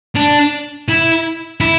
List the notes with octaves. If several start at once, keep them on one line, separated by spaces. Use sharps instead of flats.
D4
E4
E4